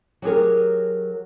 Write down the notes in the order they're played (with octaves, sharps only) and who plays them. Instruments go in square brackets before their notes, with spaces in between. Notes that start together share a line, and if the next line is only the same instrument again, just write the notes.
[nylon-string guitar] F#3 G4 G#4 A#4